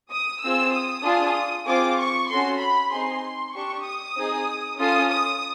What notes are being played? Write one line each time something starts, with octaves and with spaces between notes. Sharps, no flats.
D#6
C4 F4 G#4 E6
D#6
D4 F4 G#4
C4 F4 G#4 D6
C#6
C#4 F#4 A4 C6
B5
C4 D#4 G#4 C6
D4 G4 C#6
D#6
C4 D#4 G#4
C#4 F4 A4 D#6
D#6